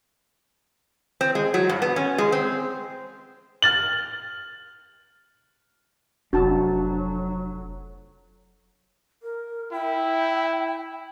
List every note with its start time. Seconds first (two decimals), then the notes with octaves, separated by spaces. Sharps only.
1.21 C4
1.35 G#3
1.54 F#3
1.69 G2
1.82 B3
1.96 C#4
2.18 G#3
2.32 C4
3.62 F6 A6 F#7
6.33 F1 F#3 D4 F#4 A5
9.23 A#4
9.72 E4 G5